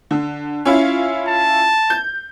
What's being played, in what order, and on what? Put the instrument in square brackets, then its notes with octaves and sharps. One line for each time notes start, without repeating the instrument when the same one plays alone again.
[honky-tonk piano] D3
C#4 E4 F4
[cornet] A5
[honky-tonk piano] G6